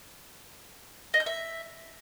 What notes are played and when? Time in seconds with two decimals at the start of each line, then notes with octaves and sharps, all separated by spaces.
1.14 D#5
1.20 G6
1.26 E5